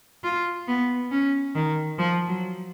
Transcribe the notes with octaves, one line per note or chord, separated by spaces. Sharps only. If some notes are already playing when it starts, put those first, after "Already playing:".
F4
B3
C#4
D#3
F3
F#3